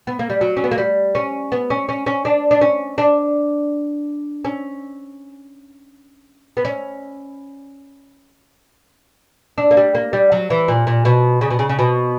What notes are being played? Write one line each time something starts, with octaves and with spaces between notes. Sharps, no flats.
B3
A#3
G3
F#3
C#4
B3
A#3
G3
C#4
B3
C#4
C#4
C#4
D4
D4
C#4
D4
C#4
B3
C#4
D4
A#3
G3
A#3
G3
F#3
E3
A#2
A#2
B2
C#3
B2
C#3
C#3
B2